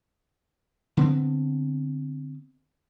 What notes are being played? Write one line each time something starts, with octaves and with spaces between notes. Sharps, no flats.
D3 B3 C4